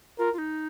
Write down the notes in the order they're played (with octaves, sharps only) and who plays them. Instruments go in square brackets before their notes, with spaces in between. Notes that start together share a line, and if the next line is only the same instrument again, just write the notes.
[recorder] F4 [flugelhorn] A#4
[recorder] F4
D#4